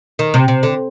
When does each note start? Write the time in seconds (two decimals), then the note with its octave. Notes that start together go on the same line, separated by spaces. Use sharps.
0.19 D#3
0.34 C3
0.48 C3
0.63 D3